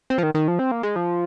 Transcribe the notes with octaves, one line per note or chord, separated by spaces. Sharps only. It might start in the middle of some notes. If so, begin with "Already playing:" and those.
C4
F3
D#3
D#3
F3
C4
A#3
G#3
F3